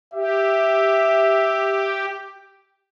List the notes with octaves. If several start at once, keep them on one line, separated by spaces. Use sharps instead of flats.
G4 E5